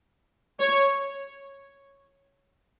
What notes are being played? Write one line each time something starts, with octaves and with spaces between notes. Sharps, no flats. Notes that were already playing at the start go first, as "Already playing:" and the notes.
C#5